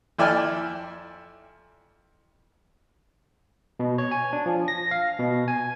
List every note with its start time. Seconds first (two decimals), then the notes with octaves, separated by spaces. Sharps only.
0.19 F2 E4 D5 G5 G#5 F6
3.79 B2
3.98 C#5
4.11 G#5
4.33 D4
4.46 F3
4.68 A#6
4.91 F5
5.19 B2
5.48 G#5